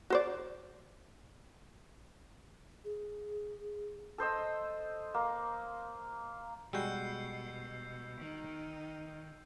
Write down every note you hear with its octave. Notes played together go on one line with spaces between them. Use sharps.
F#4 C5 D5
G#4
A4 C5 D#5 E6
A#3
B2 G3 G#3 F#4 E6 G6 C7
D#3 D#4